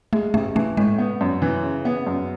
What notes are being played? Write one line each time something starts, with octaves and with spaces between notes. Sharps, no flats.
G#3 A3
A1 A3
E3 A3
A2 G#3
B3
F#2
E3
C#3
B3
F#2